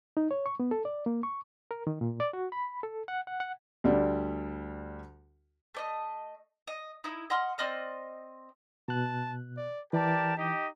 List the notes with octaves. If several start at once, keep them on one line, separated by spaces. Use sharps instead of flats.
D#4
C#5
C#6
B3
A4
D5
A#3
C#6
A#4
D#3
A#2
D5
F#4
B5
A4
F#5
F#5
F#5
D2 G3 D4
A3 D5 D#5
D#5
D#4 E4
D#5 F#5 C6 F6
C4 D5 D#5 F6
B2 A5 F#6
D5
E3 G4 A#4 D5 A5
D#4 G4 D#5